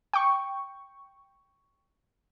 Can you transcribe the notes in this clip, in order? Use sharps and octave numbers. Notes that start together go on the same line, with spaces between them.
G5 C#6